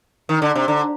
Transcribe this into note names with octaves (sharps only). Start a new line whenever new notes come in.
D#3
D3
C3
D3